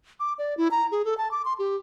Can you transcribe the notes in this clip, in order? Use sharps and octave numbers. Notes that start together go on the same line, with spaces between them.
D6
D5
E4
A#5
G#4
A4
A5
D6
C6
G4